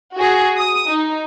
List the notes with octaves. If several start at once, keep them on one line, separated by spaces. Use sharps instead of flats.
F#4 G#4
D#6
D#4